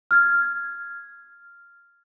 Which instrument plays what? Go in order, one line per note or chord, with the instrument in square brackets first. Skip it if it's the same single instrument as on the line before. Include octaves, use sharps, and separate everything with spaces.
[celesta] F6 G#6